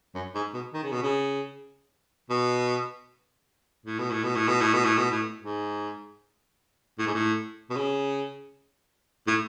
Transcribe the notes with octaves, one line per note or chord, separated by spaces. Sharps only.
F#2
G#2
B2
D#3
C#3
B2
C#3
B2
A2
B2
A2
B2
A2
B2
A2
B2
A2
B2
A2
G#2
A2
G#2
A2
B2
C#3
A2